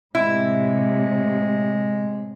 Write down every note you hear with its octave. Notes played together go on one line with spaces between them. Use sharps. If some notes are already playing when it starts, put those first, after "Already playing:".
A2 C3 G#3 E4